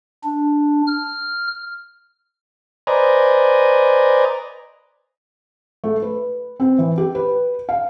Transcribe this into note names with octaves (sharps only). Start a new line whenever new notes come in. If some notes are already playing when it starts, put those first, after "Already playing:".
D4
F6
B4 C5 D5 D#5 G#5 A#5
A3
B4
C4
E3
G4
B4
F5